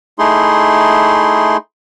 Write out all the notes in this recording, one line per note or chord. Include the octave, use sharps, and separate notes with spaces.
A3 D#4 E4 G#4 C6